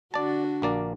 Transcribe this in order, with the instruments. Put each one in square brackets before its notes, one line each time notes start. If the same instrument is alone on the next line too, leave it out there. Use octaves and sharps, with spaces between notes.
[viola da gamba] D3 D4 F#4 [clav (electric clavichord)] D5 A5
[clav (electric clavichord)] A#1 A#3 D5